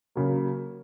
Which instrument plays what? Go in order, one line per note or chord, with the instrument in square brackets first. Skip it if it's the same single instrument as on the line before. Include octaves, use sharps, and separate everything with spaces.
[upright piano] C#3 F#3 A#3